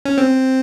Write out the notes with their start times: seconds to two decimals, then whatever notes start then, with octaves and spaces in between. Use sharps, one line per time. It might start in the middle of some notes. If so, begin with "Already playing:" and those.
0.05 C#4
0.18 C4